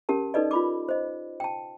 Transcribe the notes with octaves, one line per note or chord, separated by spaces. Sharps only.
C#4 G4 A#4 A5
D#4 A4 B4 D5 D#5
F4 B5 D6
C5 D#5
G5 A5